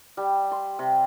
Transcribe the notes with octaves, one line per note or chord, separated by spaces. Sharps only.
G3
C6
C3